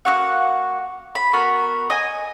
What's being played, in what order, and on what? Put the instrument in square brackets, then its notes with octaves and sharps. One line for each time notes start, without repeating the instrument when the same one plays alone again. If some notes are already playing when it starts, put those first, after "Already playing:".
[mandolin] A#3 C4 F#4 F#5
B5
B3 F#4 A#4
D#5 G#5